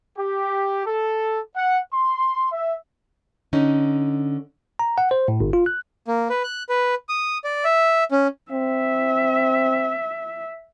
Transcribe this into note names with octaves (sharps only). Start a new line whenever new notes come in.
G4
A4
F#5
C6
E5
D3 C#4 D#4
A#5
F#5
C5
A2
G1
F4
F#6
A#3
B4
F#6
B4
D#6
D5
E5
C#4
C4 E5